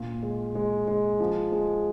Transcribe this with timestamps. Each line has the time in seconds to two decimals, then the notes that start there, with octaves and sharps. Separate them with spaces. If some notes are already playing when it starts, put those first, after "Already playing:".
Already playing: A#2
0.23 G#3
0.55 G#3
0.88 G#3
1.20 F3
1.52 G#3